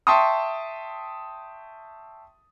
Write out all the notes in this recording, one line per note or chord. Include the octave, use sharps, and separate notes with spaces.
E5 G5 A5 C6 C#6 D#6